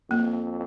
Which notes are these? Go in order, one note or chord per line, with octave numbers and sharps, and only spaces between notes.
F2 A#3